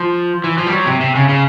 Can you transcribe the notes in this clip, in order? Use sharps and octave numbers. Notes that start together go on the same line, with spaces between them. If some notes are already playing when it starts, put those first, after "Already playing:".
Already playing: F3
E3
F3
G3
F#3
C3
C3
C#3
C#3